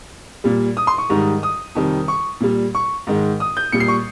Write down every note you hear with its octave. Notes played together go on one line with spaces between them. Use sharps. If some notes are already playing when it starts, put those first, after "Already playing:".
A#2 G3
D#6
C6
C#6
G#2 D#3 G3
D#6
F2 C3 D#3 G3
C#6
A#2 G3
C#6
G#2 D#3 G#3
D#6
G6
A#2 G3 C#7
C7
C#6